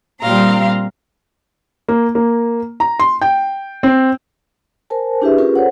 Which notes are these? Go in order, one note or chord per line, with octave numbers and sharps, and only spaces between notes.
A#2 G3 C4 F5 A#5 C6
A#3
A#3
A#5
C6
G5
C4
A#4 C5 G#5 A5
D4 E4 G4 G#4 B4 E5
C#4 F4 G4 G#4 A#4 B4
A4 C5 C#5 F#5